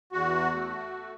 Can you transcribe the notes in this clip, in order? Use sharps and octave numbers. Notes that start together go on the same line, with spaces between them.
E2 F#4
A3